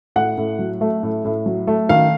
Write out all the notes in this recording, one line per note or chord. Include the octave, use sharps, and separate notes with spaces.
A2 F#5
A2
F#3
A3
A2
A2
F#3
A3
D#3 F5